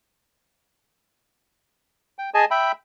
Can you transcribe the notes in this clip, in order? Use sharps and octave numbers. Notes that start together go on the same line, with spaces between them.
G5
G#4 D#5 G#5 A5
E5 G5 B5